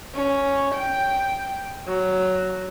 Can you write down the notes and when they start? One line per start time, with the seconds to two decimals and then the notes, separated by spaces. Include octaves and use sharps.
0.15 C#4
0.75 G5
1.88 F#3